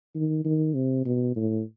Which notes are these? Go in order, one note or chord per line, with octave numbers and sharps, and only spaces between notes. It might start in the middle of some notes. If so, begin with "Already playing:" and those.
D#3
D#3
C3
B2
A2